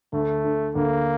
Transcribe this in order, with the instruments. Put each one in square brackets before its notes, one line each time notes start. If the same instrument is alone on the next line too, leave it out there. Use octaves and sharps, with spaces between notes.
[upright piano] D2 [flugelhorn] A3
[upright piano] D3
[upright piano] D2 [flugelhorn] A#3